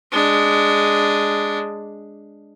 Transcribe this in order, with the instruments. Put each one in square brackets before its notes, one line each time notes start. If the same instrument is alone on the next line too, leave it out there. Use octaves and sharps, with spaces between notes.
[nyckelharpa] G#3 D4